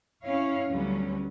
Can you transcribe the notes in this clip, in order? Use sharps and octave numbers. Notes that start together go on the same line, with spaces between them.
C#4 E4 C#5 F5
D2 D3 F#3 G3 B3 C#4